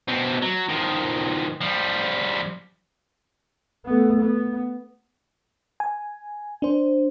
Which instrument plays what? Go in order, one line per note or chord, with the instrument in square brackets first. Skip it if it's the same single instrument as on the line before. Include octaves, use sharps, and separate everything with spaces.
[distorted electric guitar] B2 C4
F#3
D#3 F3
F3 G3
[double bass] A3 B3
B3
[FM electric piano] G#5
D4 C5